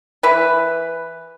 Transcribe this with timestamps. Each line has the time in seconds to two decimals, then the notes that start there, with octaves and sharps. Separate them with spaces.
0.23 E3 E4 B4